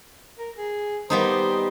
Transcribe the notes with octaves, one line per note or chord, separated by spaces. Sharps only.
A#4
G#4
G3 B3 D#4 C5